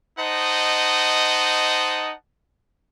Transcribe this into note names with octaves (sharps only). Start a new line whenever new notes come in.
D#4 C5 D#5 F#5 A5